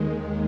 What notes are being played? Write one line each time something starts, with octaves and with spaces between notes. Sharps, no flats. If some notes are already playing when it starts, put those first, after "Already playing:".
Already playing: D#2 D#3 G#3